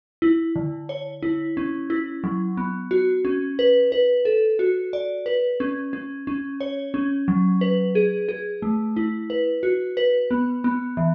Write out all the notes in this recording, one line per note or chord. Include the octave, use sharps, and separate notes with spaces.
E4
D3
C#5
E4
C#4
E4
F#3
B3
F#4
C#4
B4
B4
A4
F#4
D5
B4
C#4
C#4
C#4
C#5
C#4
F#3
B4
G#4
G#4
A3
E4
B4
F#4
B4
B3
B3
E3